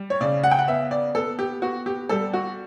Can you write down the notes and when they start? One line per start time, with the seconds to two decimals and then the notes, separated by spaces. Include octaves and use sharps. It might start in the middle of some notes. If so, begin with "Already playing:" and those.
Already playing: G3
0.10 C#5
0.20 C#3 D5
0.44 F#5
0.51 G5
0.59 F#5
0.68 B3 E5
0.91 D5
1.15 B3 A4
1.39 G4
1.62 B3 F#4
1.86 G4
2.09 G3 A4
2.33 F#4